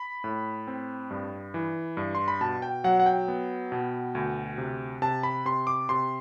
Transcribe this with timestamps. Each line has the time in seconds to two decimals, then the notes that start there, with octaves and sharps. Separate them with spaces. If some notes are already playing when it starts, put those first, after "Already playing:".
Already playing: B5
0.24 A2
0.67 C4
1.11 G2
1.54 E3
1.97 G2
2.15 C6
2.28 B5
2.41 B2 A5
2.62 G5
2.84 F#3 F#5
3.00 F#5
3.06 G5
3.28 B3
3.72 B2
4.15 D2
4.58 C3
5.02 C3 A5
5.23 B5
5.45 C3 C6
5.67 D6
5.89 C3 C6